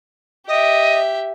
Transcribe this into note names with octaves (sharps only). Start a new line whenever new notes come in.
G4 D#5 E5